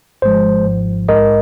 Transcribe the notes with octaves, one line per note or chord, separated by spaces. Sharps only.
G#1 G#2 F3 G#3 C5
G#1 G#2 F3
A#1 G#2 G#3 A#4 D#5